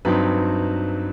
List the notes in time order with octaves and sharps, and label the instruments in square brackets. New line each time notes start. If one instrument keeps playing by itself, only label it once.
[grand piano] G2 F#3 C4 D#4 B4